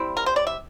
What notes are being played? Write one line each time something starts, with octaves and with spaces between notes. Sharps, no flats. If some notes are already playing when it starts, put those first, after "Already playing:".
Already playing: G3 C4 E4
A#4
C5
D5
E5